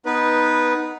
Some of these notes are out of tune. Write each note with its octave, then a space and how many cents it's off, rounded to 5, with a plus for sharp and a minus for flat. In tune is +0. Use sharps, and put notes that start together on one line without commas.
B3 +0 D#4 +0 B4 -10